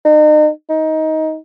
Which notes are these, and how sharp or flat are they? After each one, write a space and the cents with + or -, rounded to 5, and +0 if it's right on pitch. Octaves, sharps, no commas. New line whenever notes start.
D#4 -40
D#4 +15